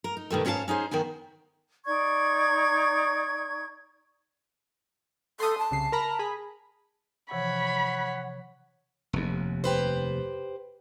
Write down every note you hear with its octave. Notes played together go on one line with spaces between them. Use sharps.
A#4
D#4
B2 D#3 G3 A3
G#2 C#4 F#4 G#4 F5 A5
C#4 D#4 G#4 C5
D#3 B3 D#4 G#5
D#4 D5 C#6 G#6
A4 C6 D#6
A5
C2 C#3 C7
A#4 A#5 B5
G#4 B5
C3 E3 F3 C#5 F#5 B5
F1 D#2
G4 B4 C5